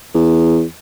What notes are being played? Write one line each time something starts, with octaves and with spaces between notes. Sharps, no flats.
E2